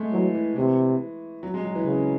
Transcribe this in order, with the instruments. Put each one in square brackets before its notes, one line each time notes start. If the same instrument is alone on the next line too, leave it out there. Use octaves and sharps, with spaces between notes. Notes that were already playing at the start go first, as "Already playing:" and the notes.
Already playing: [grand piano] G#3 A3
[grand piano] E3 [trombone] F#3
[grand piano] E3
[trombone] C3 [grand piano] E3
[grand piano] F#3
G#3
F#3
E3
[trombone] C#3